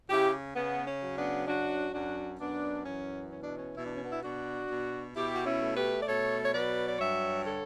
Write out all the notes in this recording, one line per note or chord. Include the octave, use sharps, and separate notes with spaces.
C#3 E4 G4
C#3 B3
C#4
F#3
B3 D4
F#2 D4 F#4
F#2 D4 F#4
F#2 B3 D4
E3 C#4
B2 C#4
D4
C#4
B2 E4
D4
C#4
B3 D4
E4
B2 D4 F#4
B2
B2 E4 G4
F#4
C#4 E4
A3
G4 B4
D5
B2 A4 C#5
C#5
F#3 B4 D5
D5
G2 C#5 E5
D3 A4 C#5